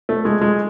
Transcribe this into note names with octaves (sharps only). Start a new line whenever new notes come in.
A3
G#3
G#3